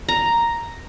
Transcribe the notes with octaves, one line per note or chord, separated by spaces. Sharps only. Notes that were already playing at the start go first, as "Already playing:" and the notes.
A#5